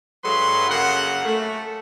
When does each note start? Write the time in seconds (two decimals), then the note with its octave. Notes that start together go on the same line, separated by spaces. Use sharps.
0.24 G2 F#3 G#3 A4 B4 C6
0.69 F#2 C#3 A#3 F#5
1.25 A3